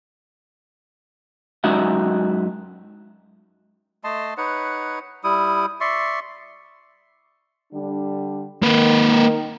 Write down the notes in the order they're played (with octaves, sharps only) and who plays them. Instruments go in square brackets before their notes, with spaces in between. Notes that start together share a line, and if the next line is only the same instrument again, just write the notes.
[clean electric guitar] F#2 G#3 D#4 F#4 E5 F#5
[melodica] A3 D#5 A5 C6
D#4 B4 C#5 F#5
G3 E4 D#6
D5 E5 C6 C#6
[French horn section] D3 G3 D4
[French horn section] D#3 [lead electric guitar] A#3 B4